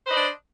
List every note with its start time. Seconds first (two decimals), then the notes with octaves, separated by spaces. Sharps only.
0.05 C5
0.07 B4
0.10 D#5
0.13 D5
0.15 D4